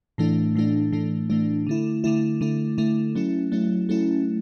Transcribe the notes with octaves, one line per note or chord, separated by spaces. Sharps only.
A2 E3 A3 D4
A2 E3 A3 D4
A2 E3 A3 D4
A2 E3 A3 D4
D3 A3 E4
D3 A3 E4
D3 A3 E4
D3 A3 E4
F#3 A3 C#4 E4
F#3 A3 C#4 E4
F#3 A3 C#4 E4